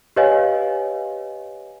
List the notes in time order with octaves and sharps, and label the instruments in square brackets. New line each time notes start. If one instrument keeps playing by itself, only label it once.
[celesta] G4 B4 C#5 D#5 F5 G#5